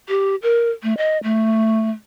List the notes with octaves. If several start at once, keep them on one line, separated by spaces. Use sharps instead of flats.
G4
A#4
A3
D#5
A3